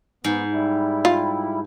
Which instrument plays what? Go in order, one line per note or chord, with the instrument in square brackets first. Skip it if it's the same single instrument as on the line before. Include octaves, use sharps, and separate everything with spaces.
[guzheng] G#2 [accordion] B3
[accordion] G3 E4
[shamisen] F4